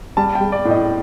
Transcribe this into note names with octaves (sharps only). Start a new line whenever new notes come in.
G3 A5
G5
G3
D5
A2
D#5